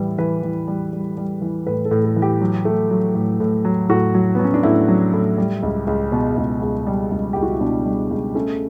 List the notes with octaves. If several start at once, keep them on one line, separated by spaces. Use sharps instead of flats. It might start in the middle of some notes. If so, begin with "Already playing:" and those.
Already playing: A2 E3 G3 E4 B4
E3 B4
E3
G3
G3
G3
E3
A2 B4
A4
A2
A4
E3
G4
F#3
A3
F#3
A2
A2
F#3
A2 F#4
F#3
F#3 B3
C#4
D4
A2 E4
F#3
A2
G3
C#2
C#2
B2
C#2
C#2
G3
C#2
C#2 G4
F#4
E4
B2 D4
G3
C#2
A3 C#4